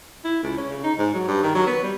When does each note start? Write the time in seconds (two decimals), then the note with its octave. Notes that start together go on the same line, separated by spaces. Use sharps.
0.24 E4
0.43 C#2
0.57 C#4
0.70 C#3
0.83 D#4
0.98 G#2
1.14 F#3
1.28 G2
1.43 D#3
1.55 F#3
1.67 B3
1.83 G3